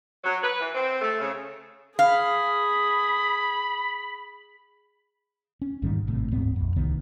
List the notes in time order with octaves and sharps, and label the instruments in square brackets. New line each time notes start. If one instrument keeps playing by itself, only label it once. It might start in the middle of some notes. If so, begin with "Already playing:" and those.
[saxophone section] F#3
B4
E3
C4
A3
C#3
[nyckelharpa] G#4 [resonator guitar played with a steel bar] F5 [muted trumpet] B5
[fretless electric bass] C#4
A#1 G#2 D#3 G3
G#1 A2 C3
D1 G#2 B3 C4
A#1 F2
D1 C2 D#3 B3